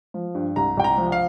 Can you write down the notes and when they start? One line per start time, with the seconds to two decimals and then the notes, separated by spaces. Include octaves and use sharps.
0.14 F3
0.35 G2
0.56 C2 A#5
0.77 C2 G5
0.84 A#5
0.98 F3
1.12 F5